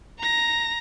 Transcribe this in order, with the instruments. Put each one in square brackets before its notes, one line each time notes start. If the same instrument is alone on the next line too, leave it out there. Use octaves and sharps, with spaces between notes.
[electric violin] A#5 A#6